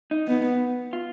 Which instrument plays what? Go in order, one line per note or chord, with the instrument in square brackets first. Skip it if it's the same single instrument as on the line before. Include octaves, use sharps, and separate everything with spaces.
[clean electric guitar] D#4
[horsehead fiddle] B3
[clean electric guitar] F4